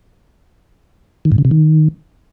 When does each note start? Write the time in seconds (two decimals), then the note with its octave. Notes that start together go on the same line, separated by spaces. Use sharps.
1.25 D#3
1.32 G#2
1.38 C#3
1.45 C3
1.51 D#3